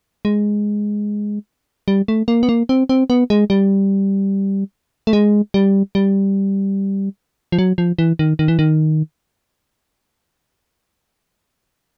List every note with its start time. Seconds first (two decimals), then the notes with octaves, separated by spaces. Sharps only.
0.25 G#3
1.88 G3
2.08 A3
2.28 A#3
2.43 B3
2.49 A#3
2.69 C4
2.89 C4
3.10 B3
3.30 G#3
3.50 G3
5.07 A3
5.13 G#3
5.54 G3
5.95 G3
7.52 F3
7.59 F#3
7.78 F3
7.99 E3
8.19 D#3
8.39 D#3
8.48 E3
8.59 D#3